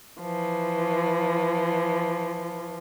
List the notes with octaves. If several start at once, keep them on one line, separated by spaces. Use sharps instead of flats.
E3 F3